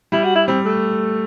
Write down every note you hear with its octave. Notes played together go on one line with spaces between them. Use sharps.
G3 E4
F#4
E4
G3 C4
A3